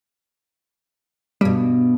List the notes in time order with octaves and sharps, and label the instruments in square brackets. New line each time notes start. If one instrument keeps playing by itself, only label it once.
[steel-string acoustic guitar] G2 B2 [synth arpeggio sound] G3